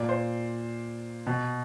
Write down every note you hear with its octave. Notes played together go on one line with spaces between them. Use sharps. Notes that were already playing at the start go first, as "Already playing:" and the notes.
Already playing: A#2 D5
C5
B2